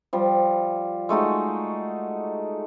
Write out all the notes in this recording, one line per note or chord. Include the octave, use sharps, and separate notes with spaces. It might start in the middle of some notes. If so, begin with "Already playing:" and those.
F3 G3
G#3 A3 D#4 F#4